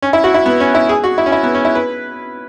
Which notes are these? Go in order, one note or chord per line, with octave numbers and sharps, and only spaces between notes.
C#4
E4
F#4
E4
B3
C#4
E4
G#4
F#4
E4
C#4
E4
B3
C#4
E4
B4